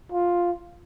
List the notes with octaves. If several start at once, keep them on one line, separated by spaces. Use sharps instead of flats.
F4